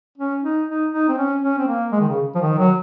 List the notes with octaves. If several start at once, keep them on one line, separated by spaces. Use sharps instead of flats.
C#4
D#4
D#4
D#4
C4
C#4
C#4
C4
A#3
G#3
D#3
C#3
F3
D#3
F#3